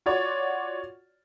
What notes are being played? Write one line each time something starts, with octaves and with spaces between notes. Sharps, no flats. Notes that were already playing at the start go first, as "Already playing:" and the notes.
F4 F#4 C#5 D5